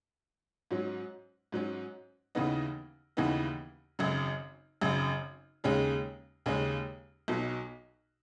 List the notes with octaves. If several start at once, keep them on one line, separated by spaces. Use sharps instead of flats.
G#2 F#3 C#4
G#2 F#3 C#4
D#2 C#3 E3 B3 D#4
D#2 C#3 E3 B3 D#4
G#1 F#2 C#3
G#1 F#2 C#3
D#2 C#3 G#3 C#4 G#4
D#2 C#3 G#3 C#4 G#4
B1 B2 F#3